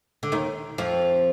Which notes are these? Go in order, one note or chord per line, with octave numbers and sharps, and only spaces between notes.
D3
D#2 D#3
F2 F3